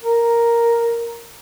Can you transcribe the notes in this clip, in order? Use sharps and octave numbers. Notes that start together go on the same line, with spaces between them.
A#4